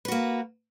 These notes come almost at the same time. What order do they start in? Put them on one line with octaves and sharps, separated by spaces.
B4 F#4 A#3